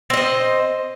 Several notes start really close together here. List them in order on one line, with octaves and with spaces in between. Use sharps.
C4 D#5 C5